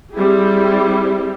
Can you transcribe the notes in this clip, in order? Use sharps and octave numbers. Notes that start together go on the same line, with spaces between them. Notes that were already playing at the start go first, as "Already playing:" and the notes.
G3 C4 E4 G4 G#4